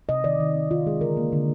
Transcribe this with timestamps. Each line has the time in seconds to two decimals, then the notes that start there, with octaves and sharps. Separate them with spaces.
0.09 C3 D#5
0.24 D#3 D5
0.40 D#3
0.55 C4
0.71 D#3 F4
0.87 G#3 G#4
1.01 D3 A#4
1.17 A#3
1.33 D3